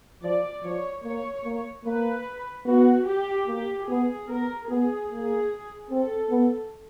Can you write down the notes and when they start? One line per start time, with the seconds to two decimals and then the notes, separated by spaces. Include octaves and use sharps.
0.22 F3 D5
0.63 F3 C#5
1.04 A#3 C#5
1.45 A#3
1.85 A#3 B4
2.66 B3 F#4
3.06 G4
3.47 A#3 G4
3.88 B3 G#4
4.28 B3 A#4
4.69 B3 G#4
5.09 A#3 G#4
5.90 C4 A4
6.30 B3